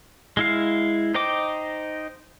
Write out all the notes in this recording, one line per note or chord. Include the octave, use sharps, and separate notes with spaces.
G#3 E4 F5
D#4 C5 D#5 G5 D6